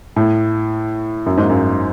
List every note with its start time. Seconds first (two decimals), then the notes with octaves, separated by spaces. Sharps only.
0.16 A2
1.26 F#2
1.37 G#2
1.49 F#2